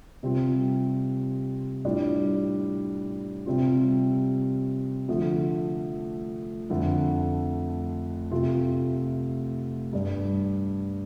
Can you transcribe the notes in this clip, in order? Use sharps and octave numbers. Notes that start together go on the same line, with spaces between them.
C3 G3 C4 F4
A2 G3 D4 F4
C3 G3 C4 F4
D3 F3 A3
F2 D3 A3
C3 A3 F4
G2 G3 D4